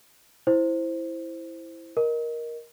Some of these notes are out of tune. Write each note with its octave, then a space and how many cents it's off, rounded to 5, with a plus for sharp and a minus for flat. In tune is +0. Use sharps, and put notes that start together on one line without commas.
E4 +0 C5 +0
A#4 +15 D#5 +0